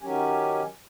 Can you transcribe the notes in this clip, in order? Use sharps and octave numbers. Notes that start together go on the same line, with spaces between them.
D#3 F#3 C#4 G4 G#5